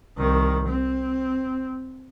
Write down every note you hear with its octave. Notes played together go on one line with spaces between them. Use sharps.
C2 D#3
C4